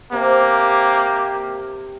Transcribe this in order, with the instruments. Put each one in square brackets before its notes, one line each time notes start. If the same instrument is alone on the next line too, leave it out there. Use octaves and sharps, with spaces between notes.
[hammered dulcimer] C3 [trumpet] A#3 [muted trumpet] G4